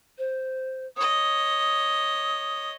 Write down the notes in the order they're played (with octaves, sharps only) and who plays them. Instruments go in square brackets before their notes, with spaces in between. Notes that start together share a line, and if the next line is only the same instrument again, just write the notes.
[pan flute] C5
[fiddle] C#5 D#5 [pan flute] D#6